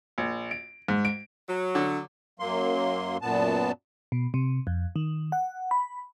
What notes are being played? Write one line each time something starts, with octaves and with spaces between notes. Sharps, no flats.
A#1
D7
G#2
D7
F#3
D3
F#2 F#3 A#3 C6
F#2 A#2 B3 A5
B2
C3
F2
D#3
F#5
B5